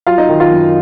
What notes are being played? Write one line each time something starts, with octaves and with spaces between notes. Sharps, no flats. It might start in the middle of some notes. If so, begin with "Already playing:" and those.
F#3 F4 F5
D#4 D#5
D#3
F4 F5
F#2